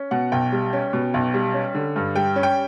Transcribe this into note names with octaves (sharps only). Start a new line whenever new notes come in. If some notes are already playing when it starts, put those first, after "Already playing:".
Already playing: C#4
B2 F#5
B1 G5
G3
C#4
B2
B1
G3
C#4
D3
G2
G3 G5
C#4
G5